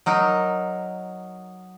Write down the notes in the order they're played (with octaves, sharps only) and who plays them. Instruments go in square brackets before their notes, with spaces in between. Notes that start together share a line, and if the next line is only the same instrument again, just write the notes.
[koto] F#3 D#4 A#4